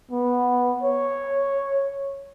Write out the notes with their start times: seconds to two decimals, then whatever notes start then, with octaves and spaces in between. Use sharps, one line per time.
0.11 B3
0.83 C#5